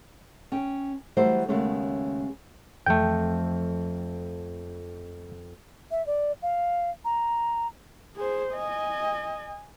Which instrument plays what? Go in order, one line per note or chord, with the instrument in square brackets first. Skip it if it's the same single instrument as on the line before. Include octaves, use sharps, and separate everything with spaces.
[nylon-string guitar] C#4 G5
E3 F#3 G3 A3 C5
D#2 C#3 G#3 A3 B3 C#4
[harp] F2 F3 [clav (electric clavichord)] A3 G5
[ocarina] E5
D5
F5
A#5
[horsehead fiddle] G#4 C5
D#5 G#5